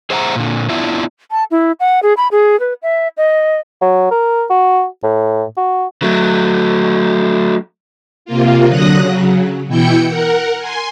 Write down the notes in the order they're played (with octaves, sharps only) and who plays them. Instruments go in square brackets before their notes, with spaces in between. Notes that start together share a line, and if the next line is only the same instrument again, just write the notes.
[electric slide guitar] G#4 C5 E5 F#5 G5 A#5
A#2 D3
B3 D4 E4 F4 E5
[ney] A5
E4
F#5
G#4
B5
G#4
B4
E5
D#5
[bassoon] F#3
A#4
F#4
A2
F#4
[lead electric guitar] F#3 A3
[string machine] C3 A#3 F4
D3 F#3 D#6 F#6 A#6
C#3 F#3
B2 E3 E4 G5 G6 C#7
A#4 F#5
G#5 C6